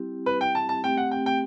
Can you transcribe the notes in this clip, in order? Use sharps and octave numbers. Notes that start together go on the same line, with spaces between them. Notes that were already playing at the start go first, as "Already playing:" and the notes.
Already playing: G3 C4 E4 G4
B4
G5
A5
A5
A3 C4 G4 G5
F#5
G5
G5